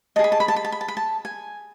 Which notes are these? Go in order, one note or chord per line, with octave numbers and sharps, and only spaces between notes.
G#4 D#5 A5
B5
A5
B5
A5
B5
A5
B5
A5
B5
A5
G#5